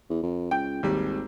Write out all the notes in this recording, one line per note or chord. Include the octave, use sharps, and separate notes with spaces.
E2
F2
C#2 G5
G#1 D#2 G3